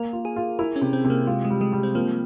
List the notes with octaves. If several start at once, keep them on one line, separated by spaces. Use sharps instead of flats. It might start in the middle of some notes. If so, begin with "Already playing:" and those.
Already playing: A#3 A#4
F4
G#4
F4
E4 A#4
C#4
C3
C4
C3
A#3
G#3 F4
G#3
G3
G#3
G3
C4
F3 A#3